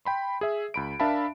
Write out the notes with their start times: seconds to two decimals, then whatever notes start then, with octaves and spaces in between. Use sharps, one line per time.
0.05 G5 B5 C6
0.41 G#4 E5
0.74 C#2 B5 D7
1.00 D4 A#4 E5 F5 A5 B5